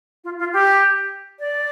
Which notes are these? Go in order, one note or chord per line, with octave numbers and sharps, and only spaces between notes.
F4
F4
G4
D5